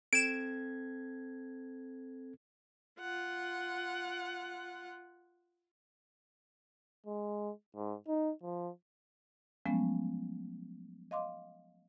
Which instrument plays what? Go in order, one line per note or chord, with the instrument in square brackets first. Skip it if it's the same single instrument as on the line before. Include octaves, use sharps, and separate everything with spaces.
[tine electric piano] C4 A4 G#6 [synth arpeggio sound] D7 E7
[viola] F4 F#5
[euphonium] G#3
G#2
D#4
F3
[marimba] F3 F#3 G#3 A3 B3 C#4
D#5 F5 C6 D6